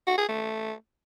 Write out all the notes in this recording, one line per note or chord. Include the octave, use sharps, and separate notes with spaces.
F#4
G#4
A3